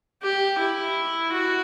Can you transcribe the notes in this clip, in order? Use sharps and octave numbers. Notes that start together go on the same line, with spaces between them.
G4
E4
F#4